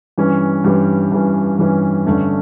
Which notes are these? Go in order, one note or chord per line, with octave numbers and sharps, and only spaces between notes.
G2 E3 G3 C#4
G2 E3 G3 C#4
G2 E3 G3 C#4
G2 E3 G3 C#4
G1 G2 D3 A3 C#4